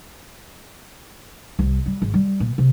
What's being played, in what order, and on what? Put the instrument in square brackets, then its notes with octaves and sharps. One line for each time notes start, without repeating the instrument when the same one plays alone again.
[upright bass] C2
G3
G#1
G3
A#2
C3